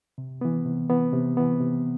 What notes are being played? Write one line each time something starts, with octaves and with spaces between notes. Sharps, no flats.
C3
E3 B3
C3
E3 B3
C3
E3 B3
C3